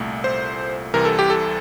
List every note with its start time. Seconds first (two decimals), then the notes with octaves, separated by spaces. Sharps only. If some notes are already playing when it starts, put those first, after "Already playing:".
Already playing: C2 A#2 A3
0.24 C5
0.94 C2 C3 E3 A#4
1.05 A4
1.19 G4
1.30 A4